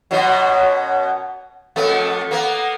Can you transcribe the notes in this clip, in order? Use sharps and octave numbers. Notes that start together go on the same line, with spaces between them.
F#2 B2 F#3
F2 A3 B3
A#3 B3